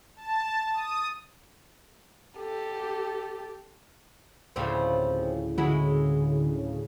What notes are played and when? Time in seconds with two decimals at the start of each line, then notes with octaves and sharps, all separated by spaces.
0.16 A5
0.74 D#6
2.39 G4 A4
4.56 D2 A2 C#3 F3 G3 C4
5.58 D3 G#3 E4 F#4